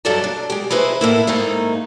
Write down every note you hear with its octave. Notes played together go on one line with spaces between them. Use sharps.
G2 F#3 D#4 A4 D5 A5
D4
G#3 G4
D#4 E4 G#4 B4 C5
A2 A#3 E4
G#2 D#3 A3 A#3 D#4